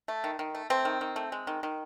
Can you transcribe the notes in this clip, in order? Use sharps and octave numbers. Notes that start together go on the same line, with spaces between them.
A3
D#3
D#3
A3
A3 C4
D#3
D#3
A3
G#3
D#3
D#3